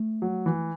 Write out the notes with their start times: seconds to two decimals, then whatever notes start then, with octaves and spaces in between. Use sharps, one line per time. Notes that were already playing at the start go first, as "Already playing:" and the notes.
Already playing: A3
0.22 F#3
0.46 E3